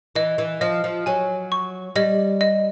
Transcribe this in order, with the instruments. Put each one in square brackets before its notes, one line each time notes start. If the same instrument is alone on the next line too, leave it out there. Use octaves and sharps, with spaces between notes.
[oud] E3 [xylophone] D#5
[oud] E3
[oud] F3 [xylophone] D#5
[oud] F3
[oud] F#3 [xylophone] G#5
[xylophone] C#6
[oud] G3 [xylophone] D#5
[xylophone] D#5